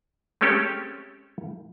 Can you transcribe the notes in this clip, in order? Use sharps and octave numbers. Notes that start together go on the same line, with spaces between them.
G#3 A3 C4 C#4 G4 A4